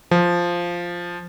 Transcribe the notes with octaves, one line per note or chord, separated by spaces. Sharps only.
F3